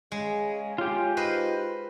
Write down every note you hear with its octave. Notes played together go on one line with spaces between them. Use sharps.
C#3 G#3
C#4 F4 G4
D#4 B4 C5 D#5